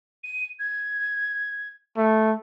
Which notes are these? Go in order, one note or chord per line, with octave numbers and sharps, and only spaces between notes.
D#7
G#6
A3